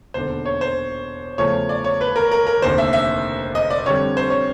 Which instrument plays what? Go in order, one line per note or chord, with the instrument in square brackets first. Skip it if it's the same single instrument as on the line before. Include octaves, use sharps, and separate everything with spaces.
[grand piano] E1 D#2 D3 C5
C#5
C5
E2 C#3 F3 A3 C#5
D5
C#5
B4
A#4
A#4
A#4
F1 D#2 D3 C5
E5
E5
D#5
D5
F2 D3 G3 C#5
C5
C#5